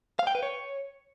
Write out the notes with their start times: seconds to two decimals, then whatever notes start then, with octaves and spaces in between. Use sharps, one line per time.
0.19 F5
0.27 G5
0.35 B4
0.43 C#5